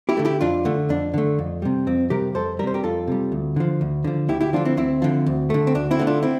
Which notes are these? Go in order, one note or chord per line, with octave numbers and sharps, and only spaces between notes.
E4 G4
D3 A3
E4 G4
F2 D4 F4
D3 A3
F2 D4
D3 A3
F2
C3 G3
F2 C4
C3 G3 G4 A#4
F2 A4 C5
C3 G3 A#4 C5
G4 A#4
F2 F4 A4
C3 G3
D2
D3 F3
D2
D3 F3
D2 E4 G4
E4 G4
D3 F3 D4 F4
C4 E4
D2 C4 E4
D3 F3
D2
D3 A3
C4
D2 D4
C4 E4
D3 A3
D4 F4
C4 E4